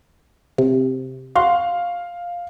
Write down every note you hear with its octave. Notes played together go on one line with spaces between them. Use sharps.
C3
F#4 F5 C6